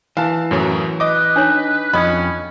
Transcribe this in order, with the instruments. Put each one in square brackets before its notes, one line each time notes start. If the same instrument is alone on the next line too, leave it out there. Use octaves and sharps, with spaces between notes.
[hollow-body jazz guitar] E3 [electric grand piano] F5 A5
[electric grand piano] F#2 A2 F#3
[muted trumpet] B4 [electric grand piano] D#5 D6
[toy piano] D4 D#4 C#5
[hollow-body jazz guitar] F2 [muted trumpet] C#4 [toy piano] D#5 D#6 [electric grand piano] B5